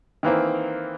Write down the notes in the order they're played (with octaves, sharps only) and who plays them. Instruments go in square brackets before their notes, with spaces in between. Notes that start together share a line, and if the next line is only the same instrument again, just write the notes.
[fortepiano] D#3 E3 A#3 C4